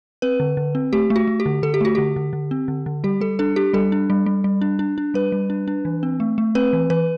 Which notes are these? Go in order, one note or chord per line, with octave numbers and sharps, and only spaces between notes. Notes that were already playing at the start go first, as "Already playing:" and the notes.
C4 B4
D3
D3
C4
A3 G4
A3
F#4
A3
G4
D3
D3 A4
G4
A3 F#4
D3 G4
D3
D3
C4
D3
D3
G3 G4
G3 A4
D4 A4
D4 G4
G3 A4
D4
G3
G3
G3
D4
D4
D4
G3 B4
G3
D4
D4
E3
C4
A3
A3
C4 B4
E3
E3 B4